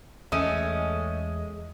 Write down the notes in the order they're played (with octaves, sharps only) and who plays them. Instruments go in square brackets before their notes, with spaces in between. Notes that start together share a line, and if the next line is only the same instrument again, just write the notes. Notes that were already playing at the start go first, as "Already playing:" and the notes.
[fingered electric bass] E2 [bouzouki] G#3 [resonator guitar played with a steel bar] A3 C#4 [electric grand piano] D#5 D#6 D#7